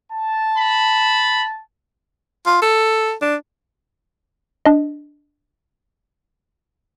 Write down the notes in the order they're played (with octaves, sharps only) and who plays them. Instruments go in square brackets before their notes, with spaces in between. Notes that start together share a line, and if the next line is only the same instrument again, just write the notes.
[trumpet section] A5
[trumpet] B5
[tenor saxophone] F4
A4
D4
[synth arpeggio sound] D4 D#5